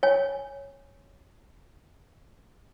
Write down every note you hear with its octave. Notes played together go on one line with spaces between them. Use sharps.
C#5 G#5